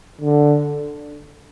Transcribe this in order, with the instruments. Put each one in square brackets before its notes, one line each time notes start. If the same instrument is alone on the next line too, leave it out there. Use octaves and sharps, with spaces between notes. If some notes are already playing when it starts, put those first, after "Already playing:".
[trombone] D3